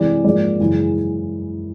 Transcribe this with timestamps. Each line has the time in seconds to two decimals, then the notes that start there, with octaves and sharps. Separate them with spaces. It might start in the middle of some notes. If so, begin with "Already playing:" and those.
Already playing: C3 E3 G#3 C4 D5
0.24 G#2 F3 A#3 D5
0.60 F#2 C#3 E3 G#3